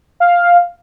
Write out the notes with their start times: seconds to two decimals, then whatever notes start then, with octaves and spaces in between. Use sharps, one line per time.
0.20 F5